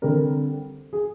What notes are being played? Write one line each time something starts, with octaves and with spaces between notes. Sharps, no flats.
D3 G3 C4 A#4
G#4